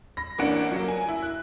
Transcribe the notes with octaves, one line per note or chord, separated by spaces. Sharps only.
B5 A#6
A1 A#3 C#4 D4 F#5 D7
F#3 A#3
G#5
E4
F#6